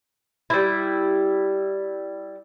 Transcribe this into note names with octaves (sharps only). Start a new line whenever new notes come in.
G3 E4